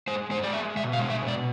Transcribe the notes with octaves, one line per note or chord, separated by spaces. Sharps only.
G#3 C5
G#3 C5
D5
G#3 E5
B2 E5
F5
G#3
E5
B2
D5